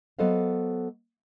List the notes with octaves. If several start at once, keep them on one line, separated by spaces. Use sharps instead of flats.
F#3 B3 A4 C5 D#5 F5